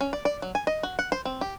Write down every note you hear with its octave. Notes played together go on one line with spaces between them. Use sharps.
C#4
D5
D5
F#3
G#5
D#5
F#4
F#5
C5
C4
G4